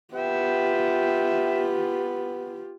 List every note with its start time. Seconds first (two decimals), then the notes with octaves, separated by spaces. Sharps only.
0.14 B3 F4 G4 E5 G5